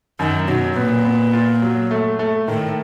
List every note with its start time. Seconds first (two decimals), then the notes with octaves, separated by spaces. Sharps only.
0.19 F#2 D#3
0.48 B2 F#3
0.76 A#2 B3
1.05 B3
1.33 F4
1.62 F#3
1.91 A3
2.19 A3
2.48 A2 D#3